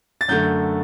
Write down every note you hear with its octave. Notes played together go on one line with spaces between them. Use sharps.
A6
F#2 D3 A3 G6